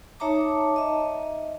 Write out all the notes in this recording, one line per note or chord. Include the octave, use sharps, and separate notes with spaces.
D#4 C#5 E5 A5 A#5 D6
D#5 E5